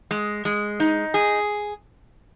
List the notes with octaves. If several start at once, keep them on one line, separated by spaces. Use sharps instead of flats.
G#3
G#3
D#4
G#4